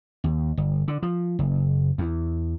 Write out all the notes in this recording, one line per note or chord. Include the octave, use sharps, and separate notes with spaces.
D#2
G1
D3
F3
F#1
E2